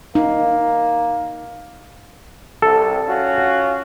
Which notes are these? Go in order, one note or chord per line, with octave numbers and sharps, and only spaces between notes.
A#3 D#4
C2 A4
C#4 F4 F#4